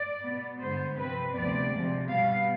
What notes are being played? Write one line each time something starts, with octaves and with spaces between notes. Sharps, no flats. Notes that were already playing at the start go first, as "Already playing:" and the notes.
Already playing: D5
B2 B3
G2 D3 G#3 B3 C5
C3 F3 C4 B4
D2 C3 F3 B3 D5
C3 F3 G#3
B2 G3 B3 F5